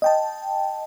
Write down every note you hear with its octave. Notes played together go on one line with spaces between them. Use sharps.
D#5 G5 A5